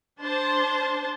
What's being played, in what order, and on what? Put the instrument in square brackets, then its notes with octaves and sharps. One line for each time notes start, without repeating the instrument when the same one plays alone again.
[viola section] D4 C5 A5